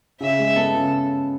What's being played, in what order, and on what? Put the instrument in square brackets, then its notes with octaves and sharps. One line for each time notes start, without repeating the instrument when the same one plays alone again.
[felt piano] C#3 [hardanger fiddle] E5
[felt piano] G#3
[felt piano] B3 [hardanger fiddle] A4
[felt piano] C#3